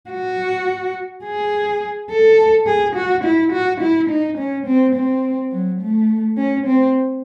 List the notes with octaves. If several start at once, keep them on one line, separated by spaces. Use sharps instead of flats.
F#4
G#4
A4
G#4
F#4
E4
F#4
E4
D#4
C#4
C4
C4
F#3
A3
C#4
C4